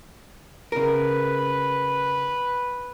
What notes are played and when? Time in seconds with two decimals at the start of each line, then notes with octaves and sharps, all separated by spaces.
0.72 C#3 A#4 B4